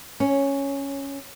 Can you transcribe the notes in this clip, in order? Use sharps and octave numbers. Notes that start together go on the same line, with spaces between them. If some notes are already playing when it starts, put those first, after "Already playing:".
C#4